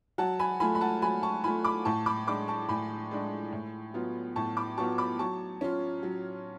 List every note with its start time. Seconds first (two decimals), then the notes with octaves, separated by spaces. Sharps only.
0.18 F#3 F#5 A5
0.39 G#5 B5
0.60 A3 F4 G#5 B5
0.75 B5
0.81 F#5 A5
1.02 F#3 G#5 B5
1.23 A5 C#6
1.44 A3 F4 G#5 B5
1.64 B5 D6
1.85 A2 A5 C#6
2.06 B5 D6
2.27 G#3 D4 B5 D6
2.48 A5 C#6
2.69 A2 G#5 B5
3.11 G#3 D4
3.52 A2
3.94 F#3 B3 F4
4.36 A2 A5 C#6
4.57 B5 D6
4.77 F#3 B3 F4 A5 C#6
4.98 B5 D6
5.19 F#3 A5 C#6
5.61 C#4 F4
6.03 F#3